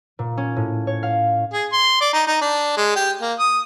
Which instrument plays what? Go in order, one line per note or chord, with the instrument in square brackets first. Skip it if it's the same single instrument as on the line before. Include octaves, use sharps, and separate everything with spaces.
[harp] A#2
C#4
A2
C#5
F5
[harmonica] G#4
C6
D5
D#4
D#4
D4
G#3
G4
A#3
D#6